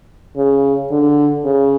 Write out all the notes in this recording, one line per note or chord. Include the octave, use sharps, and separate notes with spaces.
C#3
D3
C#3